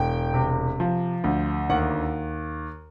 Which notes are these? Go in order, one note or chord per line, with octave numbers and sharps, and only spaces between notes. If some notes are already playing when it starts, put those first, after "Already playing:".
Already playing: E1 G5
C3
F3
D2
D#2 F#5